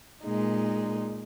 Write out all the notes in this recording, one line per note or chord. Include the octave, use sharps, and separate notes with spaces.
A#2 G#3 D#4